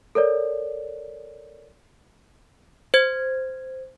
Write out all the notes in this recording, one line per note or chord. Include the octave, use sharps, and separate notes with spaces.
A4 A#4 C#5 D5
C5 G#6